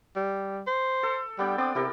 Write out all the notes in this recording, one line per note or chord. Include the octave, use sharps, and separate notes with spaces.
G3
C5
A4
G3 B3 D4 G5
C4 D5 D6 D#6
C3 E4 G4 A#4